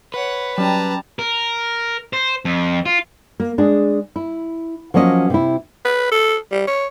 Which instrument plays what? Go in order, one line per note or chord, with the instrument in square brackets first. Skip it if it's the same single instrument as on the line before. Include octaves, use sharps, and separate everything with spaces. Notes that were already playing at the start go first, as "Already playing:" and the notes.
[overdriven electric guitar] B4 [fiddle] C#5 F#5
[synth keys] F#3 C#4 [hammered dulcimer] G3 [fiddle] A5 A#5
[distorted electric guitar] A#4
C5
F2
F4
[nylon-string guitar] A#3
G#3 D4 G#4
E4
F3 F#3 A#3 C#4 D#5
C3 E4
[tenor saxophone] B4
A4
G3
C#5